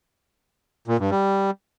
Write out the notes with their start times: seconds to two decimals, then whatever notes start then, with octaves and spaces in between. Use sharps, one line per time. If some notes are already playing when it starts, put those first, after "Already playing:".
0.88 A#2
0.99 G2
1.11 G3